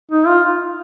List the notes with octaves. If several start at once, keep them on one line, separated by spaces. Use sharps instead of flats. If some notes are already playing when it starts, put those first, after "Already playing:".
D#4
F4